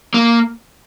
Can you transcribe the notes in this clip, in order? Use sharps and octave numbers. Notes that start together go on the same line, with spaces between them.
A#3